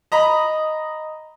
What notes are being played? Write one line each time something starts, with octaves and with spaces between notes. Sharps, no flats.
D#5 A#5 B5